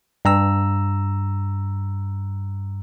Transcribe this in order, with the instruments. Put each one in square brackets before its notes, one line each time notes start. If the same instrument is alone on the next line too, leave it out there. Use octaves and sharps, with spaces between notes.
[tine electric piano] G2 A#5 E6